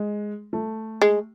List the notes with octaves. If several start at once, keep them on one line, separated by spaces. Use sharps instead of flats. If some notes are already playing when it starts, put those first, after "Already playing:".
Already playing: G#3
A3
G#3